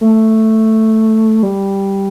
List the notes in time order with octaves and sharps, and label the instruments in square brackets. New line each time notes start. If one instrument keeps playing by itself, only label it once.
[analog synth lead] A3
G3